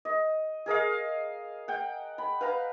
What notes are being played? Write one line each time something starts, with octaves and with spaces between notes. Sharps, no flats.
D#5
G#4 A#4 D#5 F5
F#5 G5
B5
B4 F5 A#5